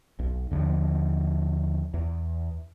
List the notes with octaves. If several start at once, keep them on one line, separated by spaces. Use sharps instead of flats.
B1
D#2 D3 F3
E2